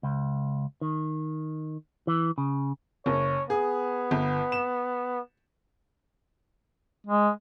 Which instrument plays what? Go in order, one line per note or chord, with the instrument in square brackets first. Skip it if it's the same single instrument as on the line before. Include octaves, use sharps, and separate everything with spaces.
[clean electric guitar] C#2
D#3
E3
C#3
[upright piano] F#1 [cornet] C#5
[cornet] B3 [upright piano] G#4
[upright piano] G1
E7
[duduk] G#3